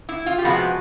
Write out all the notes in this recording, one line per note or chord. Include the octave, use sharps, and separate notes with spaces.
E4
F4
G4
C3 F3 G#3 B3 F#4